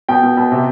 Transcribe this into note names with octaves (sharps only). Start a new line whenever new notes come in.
B2 G5
B2
B2
C3